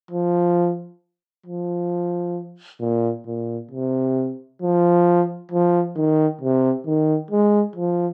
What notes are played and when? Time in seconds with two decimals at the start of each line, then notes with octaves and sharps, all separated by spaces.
0.11 F3
1.46 F3
2.81 A#2
3.27 A#2
3.71 C3
4.62 F3
5.52 F3
5.96 D#3
6.41 C3
6.87 D#3
7.31 G#3
7.76 F3